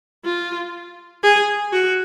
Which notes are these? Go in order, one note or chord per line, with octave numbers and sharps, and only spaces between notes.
F4
G#4
F#4